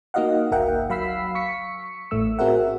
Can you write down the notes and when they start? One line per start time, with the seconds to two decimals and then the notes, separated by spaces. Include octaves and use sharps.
0.14 A#3 D#4 F#4 D#5 F5 F#5
0.51 G1 C#2 A#4 E5 F#5 G5
0.90 F#3 F5 B5 E6 B6 C7
1.35 C#6 B6 C#7
2.11 A1 A2 A3 E6
2.39 C4 F#4 G#4 A#4 E5 F#5